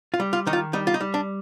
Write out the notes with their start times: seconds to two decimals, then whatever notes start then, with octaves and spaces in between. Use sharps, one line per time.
0.14 F4
0.20 G3
0.33 F4
0.47 D#3 D#4
0.53 F4
0.73 G3 D#4
0.87 F4
0.94 D#4
1.01 G3
1.14 D4